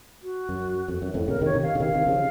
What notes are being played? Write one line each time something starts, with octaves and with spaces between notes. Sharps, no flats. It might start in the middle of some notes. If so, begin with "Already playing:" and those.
F#4
F#2
F2
F#2
F2 A2
A#2 C#3 A#4
C3 D#3 C#5
C3 D#3
F5
C#3
C3 D#3 F5
C3 D#3
C#3 F3